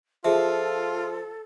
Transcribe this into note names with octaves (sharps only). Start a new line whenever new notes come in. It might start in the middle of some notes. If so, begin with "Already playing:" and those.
F3 F4 G#4 A4 E5